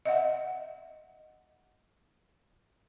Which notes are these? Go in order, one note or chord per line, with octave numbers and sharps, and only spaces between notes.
D#5 E5 F#5